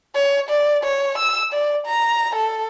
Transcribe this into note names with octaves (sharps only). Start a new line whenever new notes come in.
C#5
D5
C#5
E6
D5
A#5
A4